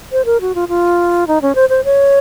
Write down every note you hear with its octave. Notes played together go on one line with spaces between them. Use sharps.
C5
A#4
F#4
F4
F4
D#4
C#4
C5
C5
C#5